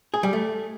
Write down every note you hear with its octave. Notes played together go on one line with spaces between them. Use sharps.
G#4
G3
A3